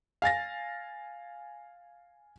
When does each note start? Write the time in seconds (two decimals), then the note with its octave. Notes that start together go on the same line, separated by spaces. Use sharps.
0.22 F5 G#5 A6 A#6